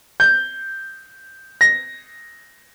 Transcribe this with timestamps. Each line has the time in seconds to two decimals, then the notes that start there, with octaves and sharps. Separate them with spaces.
0.20 G6
1.61 A#6